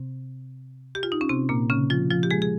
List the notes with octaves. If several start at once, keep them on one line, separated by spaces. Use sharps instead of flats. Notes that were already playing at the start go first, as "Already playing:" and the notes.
Already playing: C3 C4
G4
F4
D#4
C#4
C3 C4
A#2 A#3
C#3 C#4
F3 F4
F3 F4
G4
G#3 G#4
G#4